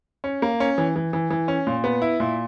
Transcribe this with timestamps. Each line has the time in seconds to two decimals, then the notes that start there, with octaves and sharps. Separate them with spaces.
0.24 C#4
0.42 A#3
0.60 C#4
0.78 E3
0.96 E3
1.13 E3
1.30 E3
1.48 C#4
1.67 A#2
1.84 B3
2.02 E4
2.20 A#2